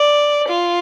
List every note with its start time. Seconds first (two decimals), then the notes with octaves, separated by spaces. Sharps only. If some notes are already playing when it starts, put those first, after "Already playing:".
Already playing: D5
0.48 F4